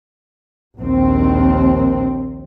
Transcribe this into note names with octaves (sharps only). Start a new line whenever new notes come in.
A#1 D#2 C4